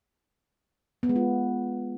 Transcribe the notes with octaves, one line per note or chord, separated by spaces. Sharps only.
B3
G#3
F4